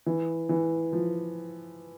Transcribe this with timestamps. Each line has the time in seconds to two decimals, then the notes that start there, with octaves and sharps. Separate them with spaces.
0.06 E3
0.49 E3
0.93 F3